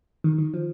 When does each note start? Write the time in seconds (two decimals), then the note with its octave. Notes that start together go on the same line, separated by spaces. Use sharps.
0.24 D#3
0.38 D#3
0.54 F3